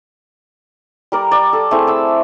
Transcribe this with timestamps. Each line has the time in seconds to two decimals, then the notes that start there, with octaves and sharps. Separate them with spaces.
1.12 G3 A#4 D5
1.32 D5
1.53 A4
1.71 A3 C4 E4 G#4
1.88 A5 E6